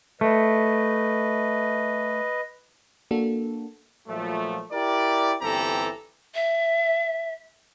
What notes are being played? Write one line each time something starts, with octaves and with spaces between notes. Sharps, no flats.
A3 B4 D#5
A#3 D4 F#4 A4
A#2 F3 F#3 A3
E4 G4 A#4 D5
G1 E3 C4 G4 A4 A#5
E5